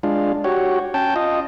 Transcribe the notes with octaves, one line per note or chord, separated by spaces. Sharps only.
G#3 D4 F4
F#4 G4 C#5
C#4 G5 A5
F4 D#5